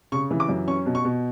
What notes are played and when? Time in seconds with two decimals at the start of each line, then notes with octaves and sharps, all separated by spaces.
0.12 C#3 C#6
0.31 E3
0.40 D6
0.49 F#2
0.67 C#4 C#6
0.86 B2
0.95 C#6
1.05 B2